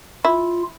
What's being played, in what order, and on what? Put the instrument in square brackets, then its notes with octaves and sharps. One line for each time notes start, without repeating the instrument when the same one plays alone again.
[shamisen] E4 [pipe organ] F4